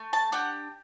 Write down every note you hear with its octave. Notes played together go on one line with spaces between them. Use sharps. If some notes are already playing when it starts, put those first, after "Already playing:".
Already playing: A3
A5
D4 G4 F#5